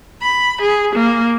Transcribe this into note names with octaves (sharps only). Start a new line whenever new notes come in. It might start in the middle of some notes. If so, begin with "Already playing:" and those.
B5
G#4
A#3